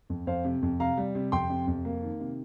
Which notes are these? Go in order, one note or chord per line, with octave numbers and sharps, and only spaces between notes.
F2
F2 C5 F5
C3
F2
C3 F5 A#5
G3
C3
F2 G5 C6
C3
F2
A#3
D#3
C3